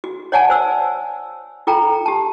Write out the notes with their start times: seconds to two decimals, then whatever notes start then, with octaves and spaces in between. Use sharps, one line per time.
0.04 F#4
0.32 C#5 D5 F#5 G#5 A5
0.50 C5 E6
1.67 F4 A4 G5 A#5
2.06 G4 A5